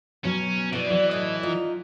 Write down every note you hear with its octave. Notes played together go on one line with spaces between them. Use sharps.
B2 F#3 C#4
B2 E4 B4 D5 D#5
E3 F#3
A2 D#5
D#4 F4